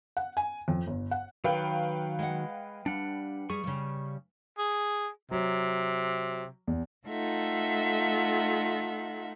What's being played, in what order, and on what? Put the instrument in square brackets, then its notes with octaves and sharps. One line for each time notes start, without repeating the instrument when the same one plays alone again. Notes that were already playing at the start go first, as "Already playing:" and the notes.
[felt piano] F#5
G#5
F2
G1
F#5
[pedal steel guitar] D#3 F#3 [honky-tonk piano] B4 F5 G5
[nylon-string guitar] G#3 F#5
[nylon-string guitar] G3 [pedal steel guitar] D4 F#5
[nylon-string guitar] G3 G#4 [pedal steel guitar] C#6
[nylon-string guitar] C#3 G3
[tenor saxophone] G#4
[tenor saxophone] C3 [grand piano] F#3
[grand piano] E2
[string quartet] A3 D#4 F4 A4 E5 F#5